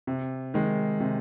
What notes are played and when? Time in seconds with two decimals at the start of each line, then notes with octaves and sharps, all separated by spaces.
0.07 C3
0.54 D#3 G#3
1.01 C3